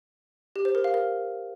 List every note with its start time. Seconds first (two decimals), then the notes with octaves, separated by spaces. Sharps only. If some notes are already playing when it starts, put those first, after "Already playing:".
0.56 G4
0.65 C5
0.75 A#4
0.84 F5
0.94 A#4